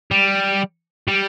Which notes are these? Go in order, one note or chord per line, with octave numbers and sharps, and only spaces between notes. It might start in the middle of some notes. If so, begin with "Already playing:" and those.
G3
G3